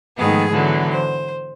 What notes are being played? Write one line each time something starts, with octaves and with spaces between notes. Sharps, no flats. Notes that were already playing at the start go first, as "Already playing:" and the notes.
G#2 D#3 F3 A3 B3 G#4
D3 E3 F#3 B3
C5